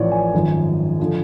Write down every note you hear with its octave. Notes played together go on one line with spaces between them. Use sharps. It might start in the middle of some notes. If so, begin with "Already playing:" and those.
Already playing: A1 A2 F3 C#5 D5
G#5
G#1 F#2 F3
D3 F3